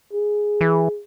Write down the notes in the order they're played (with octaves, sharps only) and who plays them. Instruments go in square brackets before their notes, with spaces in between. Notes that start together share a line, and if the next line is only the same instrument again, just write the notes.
[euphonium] G#4
[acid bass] E3